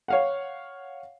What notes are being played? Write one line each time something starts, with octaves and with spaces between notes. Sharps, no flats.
C#5 F5 F#5